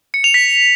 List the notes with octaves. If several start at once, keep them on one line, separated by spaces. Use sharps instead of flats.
C#7
F7
B6